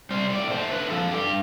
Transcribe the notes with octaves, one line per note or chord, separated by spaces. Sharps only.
G3 C5
A2 D5
A3 C5
D3 B4
F3 A4
G2 G4